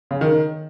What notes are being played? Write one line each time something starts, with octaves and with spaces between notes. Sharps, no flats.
C#3
D#3